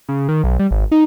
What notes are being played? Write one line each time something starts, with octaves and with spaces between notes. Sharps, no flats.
C#3
D#3
B1
G3
G#1
D#4